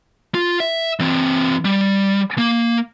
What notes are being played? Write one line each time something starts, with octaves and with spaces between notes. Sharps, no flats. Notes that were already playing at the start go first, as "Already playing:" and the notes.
F4
E5
E3 C4
G3
A#3